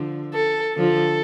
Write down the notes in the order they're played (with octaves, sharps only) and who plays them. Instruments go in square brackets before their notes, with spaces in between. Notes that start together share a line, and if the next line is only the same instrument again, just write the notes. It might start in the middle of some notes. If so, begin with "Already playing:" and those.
Already playing: [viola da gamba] D3 F3
[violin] A4
[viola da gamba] D3 F3 [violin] A4